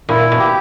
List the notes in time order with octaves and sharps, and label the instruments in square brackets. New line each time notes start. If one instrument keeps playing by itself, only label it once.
[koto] A#2 [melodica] E4
[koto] B2
[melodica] G4